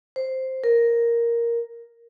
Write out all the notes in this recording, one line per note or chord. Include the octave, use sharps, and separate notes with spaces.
C5
A#4